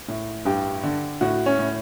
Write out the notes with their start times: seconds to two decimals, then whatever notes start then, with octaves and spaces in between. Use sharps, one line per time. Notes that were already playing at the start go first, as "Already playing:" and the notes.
0.08 A2
0.45 G2 G4
0.83 D3
1.21 A2 F#4
1.46 C#4
1.59 A2